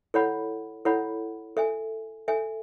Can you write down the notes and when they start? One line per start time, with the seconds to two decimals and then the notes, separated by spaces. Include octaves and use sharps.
0.14 E4 A4 C#5 F#5 B5
0.85 E4 A4 C#5 F#5 B5
1.57 A4 E5 G#5
2.28 A4 E5 G#5